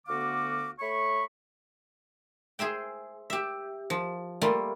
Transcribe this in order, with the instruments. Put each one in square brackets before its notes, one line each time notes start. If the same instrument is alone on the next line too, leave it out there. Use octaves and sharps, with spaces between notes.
[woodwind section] D2 D3 B3 F#4 F5 D6
A3 C#5 B5 C#6
[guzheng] G#4 C5 E5 G5
G4 E5
F3
G3 A3 A#3 F4